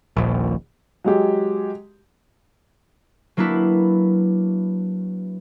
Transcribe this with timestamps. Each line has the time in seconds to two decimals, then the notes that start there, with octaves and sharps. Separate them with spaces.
0.17 D#1 A#1
1.04 F#3 G#3 G4
3.37 F#3 A#3 D4 E4 B4